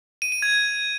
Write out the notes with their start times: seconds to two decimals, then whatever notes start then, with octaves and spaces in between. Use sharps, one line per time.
0.22 D#7
0.32 D#7
0.42 G#6